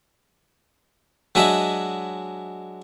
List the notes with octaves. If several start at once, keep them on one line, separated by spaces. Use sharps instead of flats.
F#3 G#3 D4 D#5 E5